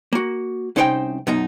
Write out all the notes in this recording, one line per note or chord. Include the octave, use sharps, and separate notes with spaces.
A#3 F#4
C2 C#4 D#4 C5 F#5 G5
F#2 B2 D#4